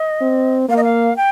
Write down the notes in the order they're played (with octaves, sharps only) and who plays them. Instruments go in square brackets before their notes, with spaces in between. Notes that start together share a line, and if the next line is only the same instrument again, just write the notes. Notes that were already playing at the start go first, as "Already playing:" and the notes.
Already playing: [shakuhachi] D#5
[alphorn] C4
[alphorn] A#3 [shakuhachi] F5
[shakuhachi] D#5
F5
G5